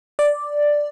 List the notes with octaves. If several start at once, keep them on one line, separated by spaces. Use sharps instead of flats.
D5